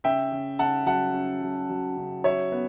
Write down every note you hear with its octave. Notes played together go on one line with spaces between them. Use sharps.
C#3 E5 G5
C#3
C#3 F#5 A5
F#3 F#5 A5
C#4
F#3
F#3
C#3
F#3 C#5 E5
B3